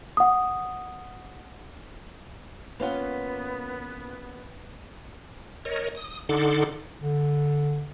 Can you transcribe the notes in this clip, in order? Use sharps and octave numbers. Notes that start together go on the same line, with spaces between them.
F#5 D#6
A#3 B3 C#4 F4 B4 F5 F#5
A#4 C#5 D#5
D#6
D3 D#4 A4 F#5 C6 D6
D3